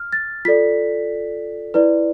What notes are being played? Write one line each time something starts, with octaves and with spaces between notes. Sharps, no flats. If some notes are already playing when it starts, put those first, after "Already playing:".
Already playing: F6
A6
F4 A4 D5 B6
E4 B4 D5